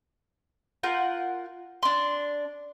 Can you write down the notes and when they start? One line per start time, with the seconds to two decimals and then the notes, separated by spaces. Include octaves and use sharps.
0.83 F4 A#4 F#5 G6
1.83 D4 C6